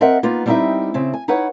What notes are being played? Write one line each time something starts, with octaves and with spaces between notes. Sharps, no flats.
C4 A#4 D#5 E5 F#5
A#3 B3 D#4 F4
G3 B3 C4 D#4 E4 E5
C#3 C4 E4
G#5
D#4 E4 B4 C#5 F#5